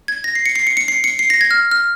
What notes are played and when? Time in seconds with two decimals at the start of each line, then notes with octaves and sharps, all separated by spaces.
0.08 G#6
0.24 A#6
0.35 C7
0.46 C#7
0.56 C7
0.67 C#7
0.77 C#7
0.88 C7
1.04 C#7
1.19 C7
1.30 A#6
1.41 G#6
1.51 F6
1.71 F6